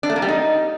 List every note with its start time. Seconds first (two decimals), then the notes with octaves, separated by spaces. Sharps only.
0.03 D4
0.10 A3
0.16 A#3
0.22 G3
0.28 D#4